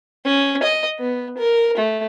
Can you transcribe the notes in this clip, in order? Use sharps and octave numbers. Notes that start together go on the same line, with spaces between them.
C#4
D#5
B3
A#4
A3